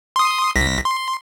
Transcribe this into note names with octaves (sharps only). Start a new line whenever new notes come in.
C6 D#6
C2 A#6 B6
C6